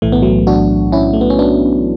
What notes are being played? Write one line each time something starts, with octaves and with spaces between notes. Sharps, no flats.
B1 A2 E3 A3
B3
F#3 A3
D4 F#4
C#4 E4
A3
B3
C#4
B3 D4